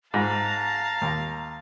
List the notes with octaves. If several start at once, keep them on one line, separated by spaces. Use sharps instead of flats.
G#2 F5 A5 A#5
D#2